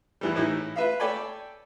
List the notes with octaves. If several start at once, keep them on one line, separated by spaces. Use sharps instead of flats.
E2 E3 G3
A2 E3 D#4 E4
F4 B4 E5 F5
A4 C#5 D5 G5 G#5 B5